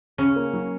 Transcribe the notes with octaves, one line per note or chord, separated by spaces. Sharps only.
C#3 C#4
A#3
F#3